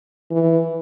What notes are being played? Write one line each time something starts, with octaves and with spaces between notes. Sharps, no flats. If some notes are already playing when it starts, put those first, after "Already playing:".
E3